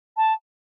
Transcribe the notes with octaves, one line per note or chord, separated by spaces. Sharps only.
A5